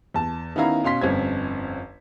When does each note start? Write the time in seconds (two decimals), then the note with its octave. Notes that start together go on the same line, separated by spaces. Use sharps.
0.14 E2 A5
0.56 D#3 B3 C#4 E4 F5 A#5
0.83 B2 C#4 F5 C6 B6
1.01 G1 F2 C4 C#4 G#6